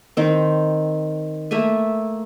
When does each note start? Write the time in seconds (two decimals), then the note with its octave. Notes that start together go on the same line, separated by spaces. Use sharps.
0.17 D#3 C4
1.51 A3 A#3 E5 G#5